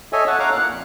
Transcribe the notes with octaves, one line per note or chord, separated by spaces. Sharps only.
A4 C#5 D#5 E5 G#5
F#5 A5 C#6
C#5 F5 F#5 A#5 C#6 D6
A#2 F#6
F2